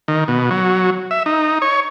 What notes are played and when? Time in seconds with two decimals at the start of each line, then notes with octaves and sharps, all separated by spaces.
0.08 D#3
0.28 B2
0.51 F#3
1.11 E5
1.26 D#4
1.62 C#5